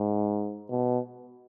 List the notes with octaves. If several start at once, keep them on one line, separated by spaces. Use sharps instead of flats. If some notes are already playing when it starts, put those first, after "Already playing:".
Already playing: G#2
B2